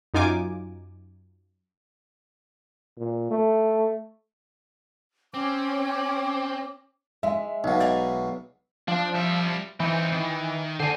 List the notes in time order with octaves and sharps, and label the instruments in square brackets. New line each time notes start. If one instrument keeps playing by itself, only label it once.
[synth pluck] F#2 D#4 F4 G#5 D6
[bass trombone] A#2
A3
[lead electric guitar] C4 [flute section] C#4 D6
[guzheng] G#3 [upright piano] E5
[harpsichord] B1 B2 [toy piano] D#4 F5
[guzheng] D5 G#5 A#5 [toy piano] D#5
[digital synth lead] F3 [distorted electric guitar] D4
[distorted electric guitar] G3 E5
[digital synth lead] E3 [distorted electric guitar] C4 D#4
[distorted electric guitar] D#3
[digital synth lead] D3 [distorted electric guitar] C5 G#5